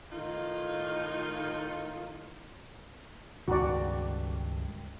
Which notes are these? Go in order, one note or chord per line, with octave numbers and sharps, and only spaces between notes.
A2 D#3 D#4 F4
C#2 G2 D#3 F#4 D5